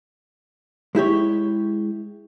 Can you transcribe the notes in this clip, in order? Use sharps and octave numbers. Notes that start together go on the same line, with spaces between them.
G#3 E4 G4 C#5